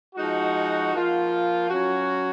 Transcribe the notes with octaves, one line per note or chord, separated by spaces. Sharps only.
F3 G#3 D#4 F#4
F3 A#3 F4
F#3 C#4 F#4